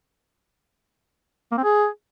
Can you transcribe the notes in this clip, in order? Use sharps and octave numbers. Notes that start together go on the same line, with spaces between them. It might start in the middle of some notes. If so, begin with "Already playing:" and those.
A#3
C4
G#4